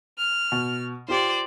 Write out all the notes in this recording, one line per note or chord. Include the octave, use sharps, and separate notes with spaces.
F6
B2
F4 G4 C5 D5